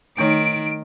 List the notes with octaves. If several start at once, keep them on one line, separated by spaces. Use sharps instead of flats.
D#3 A3 D#4 C#5 D7